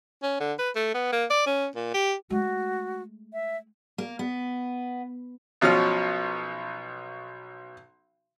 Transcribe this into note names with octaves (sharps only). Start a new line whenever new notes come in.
C#4
D3
B4
A3
B3
A#3
D5
C#4
A#2
G4
G#3 A3 F#4
E5
A#3
B3
B1 B2 F3 C#4 F6